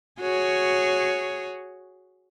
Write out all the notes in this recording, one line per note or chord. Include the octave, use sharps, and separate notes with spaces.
F#4 G#4 C#5